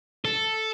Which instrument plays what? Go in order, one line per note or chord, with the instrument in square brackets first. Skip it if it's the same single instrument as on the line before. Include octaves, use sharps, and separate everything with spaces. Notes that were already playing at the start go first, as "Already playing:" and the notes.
[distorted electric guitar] A4